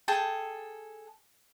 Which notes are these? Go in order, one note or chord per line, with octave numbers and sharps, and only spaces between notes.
G#4 A4 G5 A5